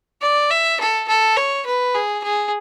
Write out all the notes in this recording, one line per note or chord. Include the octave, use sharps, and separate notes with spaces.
D5
E5
A4
A4
C#5
B4
G#4
G#4